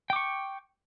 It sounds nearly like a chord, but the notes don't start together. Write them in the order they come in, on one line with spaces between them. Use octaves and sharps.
G5 D6 C#6